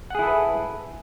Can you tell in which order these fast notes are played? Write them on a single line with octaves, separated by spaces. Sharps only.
F#5 G#4 E4 A4 B4